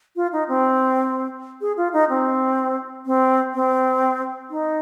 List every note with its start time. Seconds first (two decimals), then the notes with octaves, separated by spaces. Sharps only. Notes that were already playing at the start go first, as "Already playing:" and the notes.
0.16 F4
0.32 D#4
0.48 C4
1.61 G#4
1.77 F4
1.93 D#4
2.09 C4
3.06 C4
3.54 C4
4.50 D#4